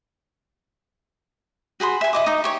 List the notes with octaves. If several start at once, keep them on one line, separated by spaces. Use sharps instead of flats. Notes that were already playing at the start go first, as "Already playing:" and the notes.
F#4 G#4 B5 C6
E5 G#5
E4 D#5 D6
D#4 D#6
G4 C#5